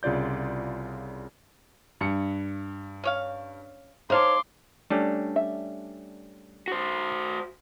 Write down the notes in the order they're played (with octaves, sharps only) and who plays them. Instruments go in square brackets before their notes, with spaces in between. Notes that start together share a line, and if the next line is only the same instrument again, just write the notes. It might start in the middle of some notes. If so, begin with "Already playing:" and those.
[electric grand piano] C2 C#3 F4 D5 G6
[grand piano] G2 C#7
[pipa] C#4 C#5 F5
[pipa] D#4 F5 A5 [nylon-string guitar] C5 C#5 [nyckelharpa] C6 D6
[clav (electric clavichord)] G3 A3 C#4 [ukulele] D4
[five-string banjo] E5
[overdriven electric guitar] F#4 C5